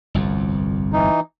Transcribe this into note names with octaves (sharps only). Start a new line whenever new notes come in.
G1 C2 F2
E3 D#4